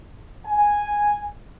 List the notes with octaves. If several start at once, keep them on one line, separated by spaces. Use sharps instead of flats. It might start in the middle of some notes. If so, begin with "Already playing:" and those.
G#5